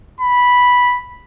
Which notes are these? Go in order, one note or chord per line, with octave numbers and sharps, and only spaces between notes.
B5